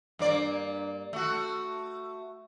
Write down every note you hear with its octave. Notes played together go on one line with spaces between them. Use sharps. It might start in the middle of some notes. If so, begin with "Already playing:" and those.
G2 A#3 D5
A3 F#4